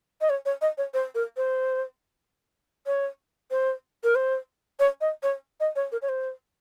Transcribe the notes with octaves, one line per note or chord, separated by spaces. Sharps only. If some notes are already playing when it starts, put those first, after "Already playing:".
D#5
C#5
C#5
D#5
C#5
C5
A#4
C5
C#5
C5
A#4
C5
C#5
D#5
C#5
D#5
C#5
A#4
C#5
C5